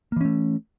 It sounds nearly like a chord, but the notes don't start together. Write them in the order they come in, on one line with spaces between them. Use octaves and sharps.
A#3 E3 C#4 A3